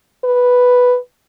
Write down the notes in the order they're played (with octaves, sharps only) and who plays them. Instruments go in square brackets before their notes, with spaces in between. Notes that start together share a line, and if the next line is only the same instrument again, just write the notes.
[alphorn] B4